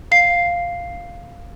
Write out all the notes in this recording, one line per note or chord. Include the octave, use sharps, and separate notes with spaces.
F5 C7